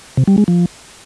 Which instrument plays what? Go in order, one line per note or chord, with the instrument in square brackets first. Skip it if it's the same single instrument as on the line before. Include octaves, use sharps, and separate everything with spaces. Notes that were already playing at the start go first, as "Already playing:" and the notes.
[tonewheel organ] C3
G3
G#3
F3